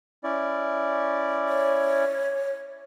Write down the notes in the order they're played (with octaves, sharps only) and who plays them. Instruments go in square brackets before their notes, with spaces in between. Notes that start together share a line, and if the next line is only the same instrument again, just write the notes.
[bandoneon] C#4 E4 D5
[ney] C#5